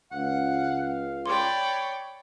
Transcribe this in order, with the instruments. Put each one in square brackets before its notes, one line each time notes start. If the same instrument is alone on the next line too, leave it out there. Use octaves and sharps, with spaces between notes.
[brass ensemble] C#2 F5 [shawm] F#5
[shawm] C#5 [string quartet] D5 G5 B5 [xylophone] C6 D6